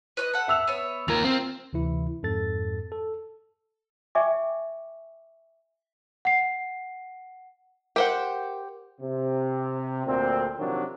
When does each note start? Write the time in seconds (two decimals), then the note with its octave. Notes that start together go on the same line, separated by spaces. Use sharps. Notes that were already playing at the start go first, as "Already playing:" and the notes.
0.17 B4 C#5 D#5
0.34 A4 F#5
0.48 E5 E6 F7
0.68 B3 C#5
1.08 D#2 F4 A#4 G#6 F7
1.24 C4
1.73 D2 C3 E3 E4
2.23 F2 G#2 A4 A6
2.92 A4
4.15 D5 E5 G5 G#5 C#6 D6
6.25 F#5 C7
7.96 G4 A#4 C5 F#5
9.01 C3
10.06 D2 A#2 D3 C4
10.58 C3 D#3 F3 F#3 D4